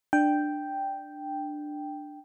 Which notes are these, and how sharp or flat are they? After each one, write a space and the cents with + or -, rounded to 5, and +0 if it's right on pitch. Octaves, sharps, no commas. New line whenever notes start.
D4 +15 G5 +0